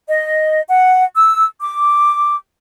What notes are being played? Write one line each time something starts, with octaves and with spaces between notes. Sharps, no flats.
D#5
F#5
E6
D6